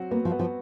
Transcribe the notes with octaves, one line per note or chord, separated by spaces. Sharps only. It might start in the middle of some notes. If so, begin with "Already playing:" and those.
Already playing: F#3 C4 F#4
A#3 B3
F3
B3
F3